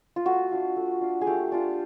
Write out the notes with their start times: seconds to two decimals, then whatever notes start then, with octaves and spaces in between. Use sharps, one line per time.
0.16 F4
0.25 A3 F#4
0.51 D4 F4
0.76 A3
1.01 D4 F4
1.21 G#4
1.27 A3 G4
1.52 D4 F4